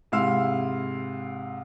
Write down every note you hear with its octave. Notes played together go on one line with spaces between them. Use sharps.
G#2 C3 E4 F5 C6 E6